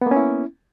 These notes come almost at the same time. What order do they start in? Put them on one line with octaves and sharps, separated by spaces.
B3 A#3 C#4 E4